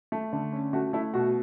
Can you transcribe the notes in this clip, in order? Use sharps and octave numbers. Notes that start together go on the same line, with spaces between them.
A3
D3
C#4
A3 F#4
A3 E4
B2 F#4